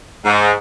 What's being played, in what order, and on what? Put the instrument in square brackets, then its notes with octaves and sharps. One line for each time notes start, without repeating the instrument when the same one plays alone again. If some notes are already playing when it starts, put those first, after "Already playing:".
[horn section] G#2